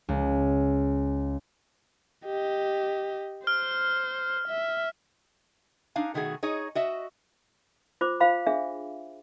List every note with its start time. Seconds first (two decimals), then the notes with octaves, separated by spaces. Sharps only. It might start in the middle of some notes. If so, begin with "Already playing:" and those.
0.09 C#2
2.26 G4 D#5
3.47 C5 F6
4.48 E5
5.96 D4 D#4 F5 G#5
6.14 B2 D#3 A3 F#4 G#4
6.43 D#4 G#4 C#5 D#5
6.75 F#4 D#5 E5
8.01 F4 C5 D6
8.20 F4 C5 F5 B5
8.47 D4 G#4 E5